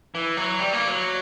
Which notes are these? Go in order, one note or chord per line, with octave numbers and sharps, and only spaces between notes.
E3
F#3
G3
A#3
F#3